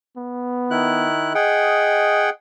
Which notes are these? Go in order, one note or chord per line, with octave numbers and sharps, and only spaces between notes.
B3
D#3 E4 F#6
G#4 D#5 F#5 G5